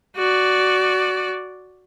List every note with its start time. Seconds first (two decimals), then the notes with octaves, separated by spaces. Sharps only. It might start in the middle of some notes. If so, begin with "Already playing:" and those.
0.17 F#4 D5